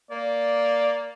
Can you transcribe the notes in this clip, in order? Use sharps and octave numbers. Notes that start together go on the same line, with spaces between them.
A#3 D5